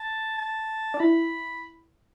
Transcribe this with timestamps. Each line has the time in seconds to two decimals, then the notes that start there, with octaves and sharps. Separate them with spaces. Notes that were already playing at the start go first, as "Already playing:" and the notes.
Already playing: A5
0.38 A5
0.94 D4
1.00 E4 B5